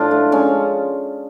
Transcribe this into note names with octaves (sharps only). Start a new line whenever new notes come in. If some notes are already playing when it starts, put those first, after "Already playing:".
Already playing: A2 F3 D4 F4
A3
G#3 C#4